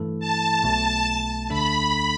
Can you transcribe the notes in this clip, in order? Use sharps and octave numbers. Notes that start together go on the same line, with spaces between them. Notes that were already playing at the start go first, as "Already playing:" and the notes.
Already playing: G2 E3 A3 E4 A4
A5
B1 B2 A3 A5
D2 D3 A3 D4 A4 B5